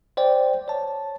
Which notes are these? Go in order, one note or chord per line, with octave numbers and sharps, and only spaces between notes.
C5 D5 G5
C#5 A5